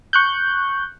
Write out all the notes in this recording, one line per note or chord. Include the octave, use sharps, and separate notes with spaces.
C#6 F#6 G6